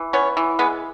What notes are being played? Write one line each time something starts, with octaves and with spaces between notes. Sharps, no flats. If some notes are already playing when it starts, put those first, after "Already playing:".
Already playing: E3
B3 C#4 C#5
E3
G#3 B3 B4